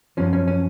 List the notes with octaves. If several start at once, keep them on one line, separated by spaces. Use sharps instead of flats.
F#2 F3 C#4
C#4
C#4